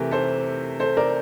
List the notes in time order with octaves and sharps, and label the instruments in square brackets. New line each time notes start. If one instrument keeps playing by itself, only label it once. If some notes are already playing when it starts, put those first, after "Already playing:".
Already playing: [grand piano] C3 E3 A3 [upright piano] G4 A#4
[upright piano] A4 C5
A4 C5
A#4 D5